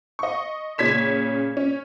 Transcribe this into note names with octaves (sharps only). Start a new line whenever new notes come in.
D#5 C#6
A#2 C#3 C#4 G#6 B6 E7
C#4